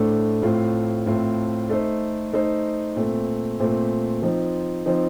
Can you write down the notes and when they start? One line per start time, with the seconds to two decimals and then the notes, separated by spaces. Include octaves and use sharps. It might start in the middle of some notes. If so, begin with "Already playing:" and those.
Already playing: A2 A3 D4 A4 C5
0.42 A2 A3 C4 F4 C5
1.06 A2 A3 C4 F4 C5
1.70 A3 D#4 A4 C5
2.33 A3 D#4 A4 C5
2.96 A#2 A3 C4
3.59 A#2 A3 C4
4.22 F3 C4 D#4
4.86 F3 C4 D#4